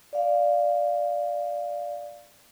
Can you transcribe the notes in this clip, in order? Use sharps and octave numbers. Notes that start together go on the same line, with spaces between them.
D5 F5